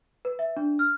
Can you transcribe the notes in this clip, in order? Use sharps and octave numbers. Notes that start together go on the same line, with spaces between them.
B4
E5
D4
F6